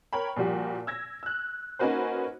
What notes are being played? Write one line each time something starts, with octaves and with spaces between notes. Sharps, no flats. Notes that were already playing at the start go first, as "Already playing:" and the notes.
A#4 C#5 G5 B5
A#2 F3 G3 F#4 G4
E6 G#6 A#6
E6 F#6
A#3 C#4 D#4 F#4 B4 C5